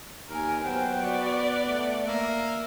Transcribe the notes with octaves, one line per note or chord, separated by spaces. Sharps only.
D#2 A#4 G#5
F#3 B3 C5 G5
F#4 D5
A3
A#3 E5